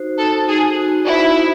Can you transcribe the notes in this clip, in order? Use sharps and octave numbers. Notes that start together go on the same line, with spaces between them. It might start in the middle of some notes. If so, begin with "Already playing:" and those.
Already playing: D#4 F#4 C5
D#4 A4
D#4 G#4
F#4
E4 C5
D#4